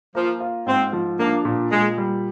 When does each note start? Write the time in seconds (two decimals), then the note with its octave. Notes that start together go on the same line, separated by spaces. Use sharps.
0.15 F3 A#3
0.40 F4
0.66 G#2 C4
0.93 F3
1.19 A#3 D4
1.45 A#2
1.71 A#2 G#3
1.98 G3